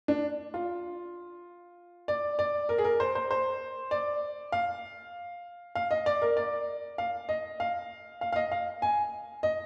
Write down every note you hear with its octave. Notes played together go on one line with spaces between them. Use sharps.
D4
F4
D5
D5
A#4
G#4
A#4
C5
C5
C5
D5
F5
F5
D#5
D5
A#4
D5
F5
D#5
F5
F5
F5
D#5
F5
G#5
D#5